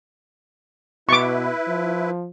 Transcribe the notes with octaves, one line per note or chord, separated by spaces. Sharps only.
B2 E4 B4 C#6 D6
F3